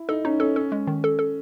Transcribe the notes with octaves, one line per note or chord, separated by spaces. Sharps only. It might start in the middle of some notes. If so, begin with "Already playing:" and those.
Already playing: E4
D#4 A4
C#4 D#4
C#4 A4
C#4 A4
G#3
D#3
A4
A4